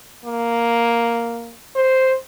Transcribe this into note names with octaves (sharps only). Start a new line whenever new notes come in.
A#3
C5